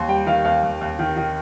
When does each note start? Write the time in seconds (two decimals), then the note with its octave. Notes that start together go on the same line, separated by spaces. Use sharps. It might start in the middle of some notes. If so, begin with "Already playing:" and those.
Already playing: D#2 C6
0.08 G3 G5
0.26 D#3 F5
0.45 D#2 F5
0.63 D#2
0.81 D#2
0.99 D#3
1.17 D#3